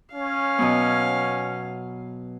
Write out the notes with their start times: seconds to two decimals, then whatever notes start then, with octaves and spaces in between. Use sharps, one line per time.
0.14 C#4 F5
0.58 B2 F#3 B3